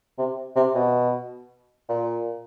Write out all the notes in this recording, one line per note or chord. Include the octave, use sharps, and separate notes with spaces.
C3
C3
B2
A#2